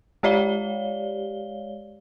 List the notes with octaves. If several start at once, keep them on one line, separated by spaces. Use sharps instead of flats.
G#3 G4 C#5 D5 F5 G7